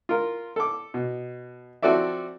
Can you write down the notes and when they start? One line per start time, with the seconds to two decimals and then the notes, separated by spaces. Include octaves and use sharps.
0.09 F4 A#4
0.56 A4 D6
0.94 B2
1.83 F3 C4 F#4 A4 D5 E5